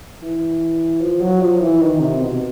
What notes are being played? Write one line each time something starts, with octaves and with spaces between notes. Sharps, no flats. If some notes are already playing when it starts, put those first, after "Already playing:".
E3
F3
F#3
F3
E3
D#3
C3
B2